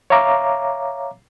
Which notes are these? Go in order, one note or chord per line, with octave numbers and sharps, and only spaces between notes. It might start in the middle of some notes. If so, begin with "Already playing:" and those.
C#5 E5 F5 A#5 D6